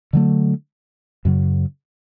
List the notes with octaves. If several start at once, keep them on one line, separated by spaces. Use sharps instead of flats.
D3 F#3 A3
F#2 C#3 F#3